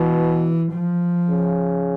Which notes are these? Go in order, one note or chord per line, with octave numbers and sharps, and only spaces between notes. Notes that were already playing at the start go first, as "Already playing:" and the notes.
Already playing: B2 E3
F3
C#3